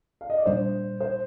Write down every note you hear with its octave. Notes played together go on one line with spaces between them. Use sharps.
F5
D#5
D5
A#2 G3 D4 C5
C5